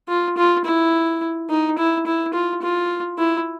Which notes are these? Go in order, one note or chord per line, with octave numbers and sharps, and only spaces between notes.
F4
F4
E4
D#4
E4
E4
F4
F4
E4